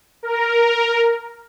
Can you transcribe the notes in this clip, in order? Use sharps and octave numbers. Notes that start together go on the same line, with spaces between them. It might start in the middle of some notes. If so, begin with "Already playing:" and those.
A#4